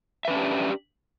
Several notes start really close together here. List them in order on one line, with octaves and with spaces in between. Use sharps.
E5 B4 C#4 D4 G4